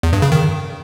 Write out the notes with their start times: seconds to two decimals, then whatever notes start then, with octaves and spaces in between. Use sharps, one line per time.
0.03 E2
0.13 G2
0.22 C#3
0.32 D#3